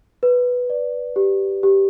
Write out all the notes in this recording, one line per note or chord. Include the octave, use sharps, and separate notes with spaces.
B4
D5
G4
G4